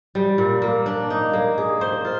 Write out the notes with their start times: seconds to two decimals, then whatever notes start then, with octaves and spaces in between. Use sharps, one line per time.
0.15 G3
0.38 A#2
0.62 A#3
0.86 D4
1.10 D#4
1.33 A#3
1.58 G#4
1.81 C5
2.05 F4